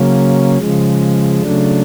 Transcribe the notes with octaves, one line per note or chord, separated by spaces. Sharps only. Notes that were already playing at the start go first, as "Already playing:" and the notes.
Already playing: C#3 F#3 A#3 C#4
C#3 F3 G#3
C#3 F#3 A3 D4